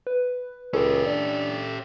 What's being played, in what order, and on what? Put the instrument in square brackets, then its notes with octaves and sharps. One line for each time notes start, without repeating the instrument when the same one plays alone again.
[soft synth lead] B4
[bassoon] C#2 [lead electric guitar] C#4 G4 [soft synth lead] A4
[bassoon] D4